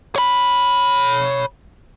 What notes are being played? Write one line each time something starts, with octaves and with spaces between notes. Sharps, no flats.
C#5 B5